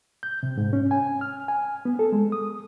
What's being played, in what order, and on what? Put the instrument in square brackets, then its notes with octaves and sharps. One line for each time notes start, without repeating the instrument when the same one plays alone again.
[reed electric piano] G6
C3
G#2
C#4
G#5
F6
G#5
B3
A4
G#3
D#6